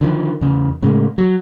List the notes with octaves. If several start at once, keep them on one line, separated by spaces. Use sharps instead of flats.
D3 D#3 F3
E2 C#3
A2 C#3 G#3
F#3